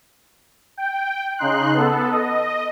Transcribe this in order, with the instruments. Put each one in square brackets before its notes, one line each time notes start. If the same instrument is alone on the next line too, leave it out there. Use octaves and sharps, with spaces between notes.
[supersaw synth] G5
C#3 D#4 C6 F#6
B3 A4
D#5